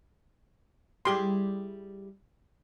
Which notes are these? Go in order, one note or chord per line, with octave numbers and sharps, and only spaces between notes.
G3 E4 G4 G#4 C6